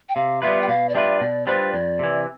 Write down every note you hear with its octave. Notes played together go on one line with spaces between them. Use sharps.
G5
C3 F5
G3 B3 F4 B4 E5
G5
B2 F5
D5
G3 D4 F4 B4 E5
B2 D5
G3 D4 F4 B4 C5
F2 D5
C3 E3